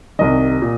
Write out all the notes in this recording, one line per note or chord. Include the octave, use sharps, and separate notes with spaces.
C2 C3 D#3 D#5
A#2